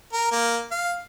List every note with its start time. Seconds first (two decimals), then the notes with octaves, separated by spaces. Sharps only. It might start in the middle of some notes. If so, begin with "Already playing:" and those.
0.13 A#4
0.31 A#3
0.71 F5